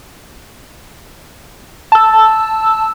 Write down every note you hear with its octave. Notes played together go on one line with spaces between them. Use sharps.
A5 E6